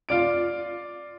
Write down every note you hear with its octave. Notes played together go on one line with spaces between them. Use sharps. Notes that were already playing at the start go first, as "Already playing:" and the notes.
F4 D5 D7